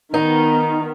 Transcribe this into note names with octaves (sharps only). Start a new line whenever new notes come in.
D#3 B3 D#4